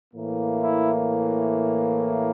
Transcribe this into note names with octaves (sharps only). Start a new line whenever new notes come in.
A2 E3 A#3
E4